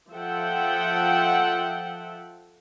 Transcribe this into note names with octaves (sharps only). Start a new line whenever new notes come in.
F3 A4 E5 F#5 G5